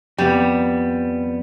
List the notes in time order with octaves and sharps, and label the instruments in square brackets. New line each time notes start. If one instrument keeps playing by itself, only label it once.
[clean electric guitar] F2 B3 [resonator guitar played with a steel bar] G3